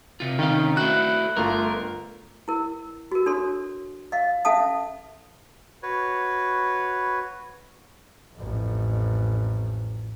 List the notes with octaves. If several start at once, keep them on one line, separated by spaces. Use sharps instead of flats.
C3 F4
C3 D#3 C#4 F5
A3 E4 F#4 F#6
G1 A3 F4 A#4
E4 A#4
F#4 A#4
D4 A4 C#5 C6
D#5 F5
C#4 A4 E5 F5 A5 D#6
F#4 B4 C#5
A1 F2